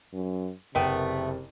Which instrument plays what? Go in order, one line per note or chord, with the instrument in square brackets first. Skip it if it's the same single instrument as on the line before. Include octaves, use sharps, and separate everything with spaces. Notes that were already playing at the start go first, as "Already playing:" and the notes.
[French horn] F#2
[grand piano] F#1 A#4 D#7 [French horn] C3 [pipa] A3 B3 G5